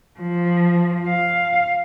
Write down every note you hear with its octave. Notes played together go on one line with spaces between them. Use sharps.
F3
F5